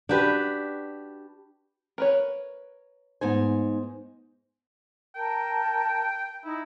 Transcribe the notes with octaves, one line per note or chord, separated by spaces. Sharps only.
D4 F#4 G4 B4
A#4 B4 C#5
G#2 B3 D#4 C5 G#5
A#4 G5 A5
D#4 E4